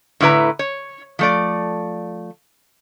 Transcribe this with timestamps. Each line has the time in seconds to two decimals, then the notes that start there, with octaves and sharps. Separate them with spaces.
0.20 A2 D3 E4 B4 A#5
0.59 C#5
1.19 F3 A3 D5